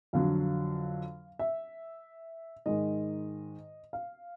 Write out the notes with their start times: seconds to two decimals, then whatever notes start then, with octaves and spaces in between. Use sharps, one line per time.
0.13 F2 D3 F#3 F5
1.39 E5
2.66 G#2 D#3 G#3 D#5
3.93 F5